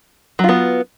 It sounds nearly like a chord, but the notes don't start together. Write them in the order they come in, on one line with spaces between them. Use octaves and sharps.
F#3 F4 B3